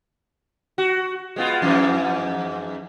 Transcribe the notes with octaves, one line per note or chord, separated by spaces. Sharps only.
F#4
G#3 B3 F4
F2 G#2 E3